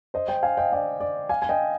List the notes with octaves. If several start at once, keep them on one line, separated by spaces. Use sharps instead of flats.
C5 D#5
D#5 G5
F5 G#5
D#5 G5
D5 F5
D5
F5 G#5
G#5
D#5 G5